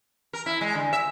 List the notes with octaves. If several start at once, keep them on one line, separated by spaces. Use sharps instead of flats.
A#4
E4
G#3
D3
E5